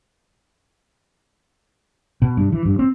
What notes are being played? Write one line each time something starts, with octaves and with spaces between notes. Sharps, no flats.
B2
G2
E3
G2
C4